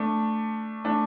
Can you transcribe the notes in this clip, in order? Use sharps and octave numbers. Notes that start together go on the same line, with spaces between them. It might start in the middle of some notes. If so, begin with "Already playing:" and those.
Already playing: A3 D4
A3 D4